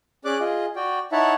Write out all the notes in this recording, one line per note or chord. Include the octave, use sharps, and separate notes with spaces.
C#4 G#4 D5 D6 F#6
F4 G#4 D#5
F#4 D5 G5
D#4 E4 C#5 E5 F#5 A5